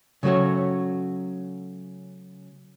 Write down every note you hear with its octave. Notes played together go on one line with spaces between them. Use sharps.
C#3 F#3 A3 F#4 C#5